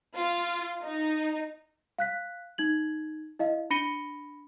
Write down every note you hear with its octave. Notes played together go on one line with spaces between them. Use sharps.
F4
D#4
F5 F#6 B6
D#4 G#6 F#7
E4 D#5 F5
D4 B5 A#6 C#7 D#7 G7